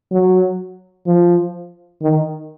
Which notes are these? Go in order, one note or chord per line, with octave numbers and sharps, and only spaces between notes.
F#3
F3
D#3